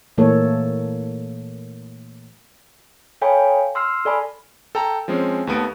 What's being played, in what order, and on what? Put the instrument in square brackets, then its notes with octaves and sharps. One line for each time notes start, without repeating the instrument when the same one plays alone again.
[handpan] A#2 E3 A3 A#3 A4 C#5
[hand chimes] A4 C#5 F5 G5 G#5 B5
C6 E6 F6 C7
A4 D5 G#5 B5
[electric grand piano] A4 G5 A#5
F3 G#3 C4 C#4
D#2 A3 B3 D7